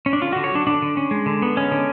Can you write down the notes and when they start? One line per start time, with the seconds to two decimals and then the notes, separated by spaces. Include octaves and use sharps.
0.06 C#4
0.13 D4
0.21 D3 F4
0.32 D3 F#4
0.44 C#5
0.52 F#3 D4
0.67 D3 D4
0.82 D3
0.97 C#4
1.11 G#3
1.26 D3
1.42 B3
1.57 G#3 C#4
1.71 D3